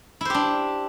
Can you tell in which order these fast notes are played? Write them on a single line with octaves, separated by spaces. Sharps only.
E4 C5 G4 D4